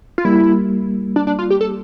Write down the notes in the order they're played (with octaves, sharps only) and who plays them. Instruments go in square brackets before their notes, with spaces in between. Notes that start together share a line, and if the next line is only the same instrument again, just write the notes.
[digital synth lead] F4
[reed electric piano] G3 A#3 [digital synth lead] E4
[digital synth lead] D4
D4
F4
G4
A4